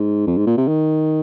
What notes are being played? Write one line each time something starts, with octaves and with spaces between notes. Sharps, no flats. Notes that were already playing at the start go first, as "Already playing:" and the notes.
Already playing: G#2
F2
G#2
A#2
C3
D#3